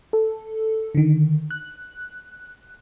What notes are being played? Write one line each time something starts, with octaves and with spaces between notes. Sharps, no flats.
A4
D3 D#3
F#6